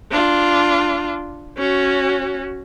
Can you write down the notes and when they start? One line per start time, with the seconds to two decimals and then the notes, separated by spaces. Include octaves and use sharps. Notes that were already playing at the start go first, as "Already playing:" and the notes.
0.11 D4 F4
1.58 C#4 F#4